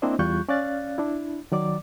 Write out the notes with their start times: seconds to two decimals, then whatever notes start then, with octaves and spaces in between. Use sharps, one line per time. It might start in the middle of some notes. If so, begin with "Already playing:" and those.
0.02 A#3 C4 D4 E4 C5 D#5
0.19 E2 G3 F4 C#6 F#6 G6
0.49 C#4 D5 F5 F#6 A6
0.98 D4 E4
1.52 D#3 F#3 D5 D6